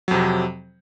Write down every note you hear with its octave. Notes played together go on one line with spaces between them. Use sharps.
F2 C3 F#3